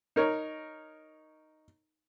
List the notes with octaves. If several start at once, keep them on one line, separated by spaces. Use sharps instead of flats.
D#4 A#4 C#5